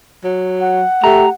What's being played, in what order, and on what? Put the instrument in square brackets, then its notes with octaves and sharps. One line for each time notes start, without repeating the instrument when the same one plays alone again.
[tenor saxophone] F#3
[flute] F#5
[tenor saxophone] A3 [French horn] G4 [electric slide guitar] A#5